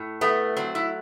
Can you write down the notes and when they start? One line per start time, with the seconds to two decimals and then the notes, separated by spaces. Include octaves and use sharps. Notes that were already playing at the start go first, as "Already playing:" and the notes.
Already playing: A2
0.21 A3 B3
0.57 F#3 C4
0.75 E4